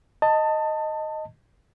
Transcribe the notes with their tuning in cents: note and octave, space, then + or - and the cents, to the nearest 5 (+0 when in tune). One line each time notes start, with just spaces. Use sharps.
D#5 +0 A5 +20